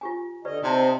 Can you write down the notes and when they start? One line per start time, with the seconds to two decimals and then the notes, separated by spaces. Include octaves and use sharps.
0.01 F4 G4 G#5
0.45 D3 G4 B4 D5 D#5
0.64 C3 C4 D#4 C5 D5 D#5 A5